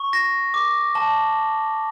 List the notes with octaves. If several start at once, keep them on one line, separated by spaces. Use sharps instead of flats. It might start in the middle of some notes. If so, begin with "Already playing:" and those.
Already playing: C#6
A#6
D6
A5